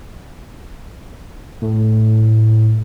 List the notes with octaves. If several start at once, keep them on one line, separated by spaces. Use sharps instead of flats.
A2